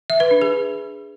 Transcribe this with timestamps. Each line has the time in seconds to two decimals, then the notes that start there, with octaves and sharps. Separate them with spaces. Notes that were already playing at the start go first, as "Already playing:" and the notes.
0.10 E5
0.20 B4
0.31 D4
0.41 G#4